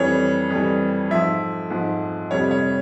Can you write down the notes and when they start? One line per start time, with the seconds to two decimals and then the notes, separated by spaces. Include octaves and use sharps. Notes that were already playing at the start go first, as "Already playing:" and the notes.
Already playing: F2 E3 G3 C#5
0.50 F2 E3 G3
1.11 G#2 F3 E5
1.70 G#2 F3
2.31 F2 C3 G3 C#5
2.51 C#5